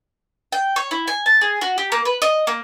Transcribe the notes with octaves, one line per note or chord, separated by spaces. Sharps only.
G5
C#5
E4
G#5
A5
G#4
F#4
G4
A#3
B4
D#5
A#3